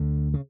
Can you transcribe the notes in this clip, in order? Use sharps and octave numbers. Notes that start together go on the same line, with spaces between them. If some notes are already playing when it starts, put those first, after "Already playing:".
Already playing: D2 D3
C#3